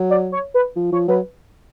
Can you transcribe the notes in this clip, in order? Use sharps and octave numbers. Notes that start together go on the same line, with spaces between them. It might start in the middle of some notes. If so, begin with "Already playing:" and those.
Already playing: F#3
D5
C#5
B4
F3
F3 C#5
F#3 B4